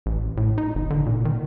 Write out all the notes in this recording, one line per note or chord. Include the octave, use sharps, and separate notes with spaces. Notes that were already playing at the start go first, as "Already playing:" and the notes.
A1
A2
D#4
G1
D3
A#2
D#3